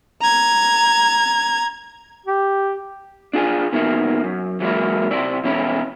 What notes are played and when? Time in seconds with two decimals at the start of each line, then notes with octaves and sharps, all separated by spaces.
0.21 A#5 G#6
2.26 G4
3.33 D4 F4 G#4
3.73 B2 D#3 E3 A#3 E4
4.24 F#2
4.60 E3 F#3 G#3 A#3 E4
5.11 C3 E4 D5
5.44 B2 E3 C#4 E4